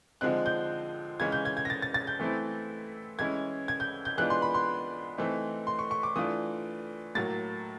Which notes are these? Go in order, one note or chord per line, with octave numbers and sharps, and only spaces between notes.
D3 F3 G#3 C4 D#4 F#6
G6
C#3 E3 G#3 C#4 G#6
G6
G#6
G#6
A#6
A6
A6
A6
G6
E3 A3 C4 E4
E3 G#3 C#4 E4 G#6
G#6
G6
G6
E3 G#3 B3 D4 F4 F#6
C6
B5
C6
E3 A3 C4 D#4
C6
C#6
C#6
D6
E3 A3 D4 F4 D#6
A2 F#3 A#3 A6